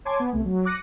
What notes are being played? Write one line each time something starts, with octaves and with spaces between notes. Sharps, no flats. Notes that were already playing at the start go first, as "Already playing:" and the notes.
C#5 G#5 A5 C6 D6 G#6
B3
C2 A3
F#3
D6 F#6 A#6 C#7 D#7